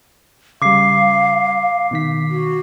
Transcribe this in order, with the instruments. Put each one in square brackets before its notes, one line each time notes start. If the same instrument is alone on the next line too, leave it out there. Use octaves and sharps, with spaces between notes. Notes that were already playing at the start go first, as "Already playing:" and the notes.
[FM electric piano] C#3 G3 [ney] F5 [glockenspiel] D6 C7
[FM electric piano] B2 D#3 B6
[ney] F#4